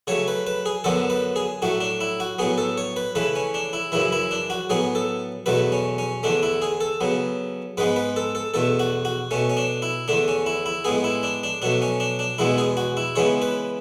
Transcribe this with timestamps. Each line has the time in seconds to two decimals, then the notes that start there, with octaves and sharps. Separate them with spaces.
0.07 C#3 F#3 A3 C#5
0.28 B4
0.47 B4
0.66 G#4
0.84 F#2 D3 F#3 B3 A4
1.10 B4
1.36 G#4
1.62 A2 F#3 A3 F#4
1.81 D4
2.01 E4
2.20 F#4
2.39 A2 F#3 B3 G#4
2.58 A4
2.78 C#5
2.96 B4
3.15 C#3 E3 A3 B4
3.36 C#4
3.54 D4
3.73 E4
3.92 F#2 C#3 E3 E4
4.12 E4
4.31 D4
4.50 F#4
4.70 A2 F#3 B3 G#4
4.95 A4
5.46 E2 B2 F#3 A3 B4
5.72 C#4
5.98 C#4
6.23 E2 D3 A3 D4
6.43 E4
6.62 G#4
6.81 A4
7.01 C#3 F#3 B3
7.77 G#2 G#3 B3 B4
7.96 B4
8.16 A4
8.35 A4
8.54 E2 B2 A3 A4
8.80 F#4
9.05 F#4
9.31 B2 A3 C#4
9.50 C#4
9.57 D4
9.82 E4
10.08 E2 D3 A3 D4
10.28 C#4
10.46 E4
10.66 E4
10.85 A2 G#3 B3 G#4
11.04 E4
11.23 D4
11.43 D4
11.62 B2 F#3 A3 D4
11.82 C#4
12.00 D4
12.19 D4
12.38 E2 B2 G#3 B3 E4
12.58 G#4
12.77 F#4
12.97 E4
13.16 C#3 E3 G#3 B3 C#5
13.42 B4